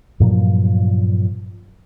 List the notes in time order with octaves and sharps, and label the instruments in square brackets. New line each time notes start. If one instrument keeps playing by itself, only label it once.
[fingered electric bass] G2 A#2 F3 F#3